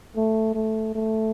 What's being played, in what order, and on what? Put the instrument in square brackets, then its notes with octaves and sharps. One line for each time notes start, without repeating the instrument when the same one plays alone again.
[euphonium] A3
A3
A3